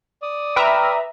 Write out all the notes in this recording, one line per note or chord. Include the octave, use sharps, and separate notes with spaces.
D5 D#6
B4 E5 G5 A#5 B5 F6